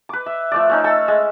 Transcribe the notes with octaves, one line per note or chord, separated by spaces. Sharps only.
B4 D6
E5
F3 A3 D5
A3 C#4 D#4
A4 A5 E6
G#3